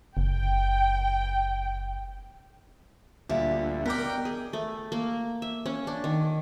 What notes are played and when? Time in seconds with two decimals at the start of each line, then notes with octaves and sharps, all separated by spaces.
0.17 F#1 G5
3.30 D2 A#2 G3 E5
3.86 B2 B3 A#4 D5 G5 A#5 D6
4.25 G#4
4.53 A3
4.92 A#3
5.42 E5
5.66 C#4
5.87 D4
6.04 D#3